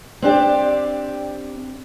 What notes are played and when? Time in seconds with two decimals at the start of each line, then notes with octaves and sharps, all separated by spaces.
0.22 C4 D4 G4 D5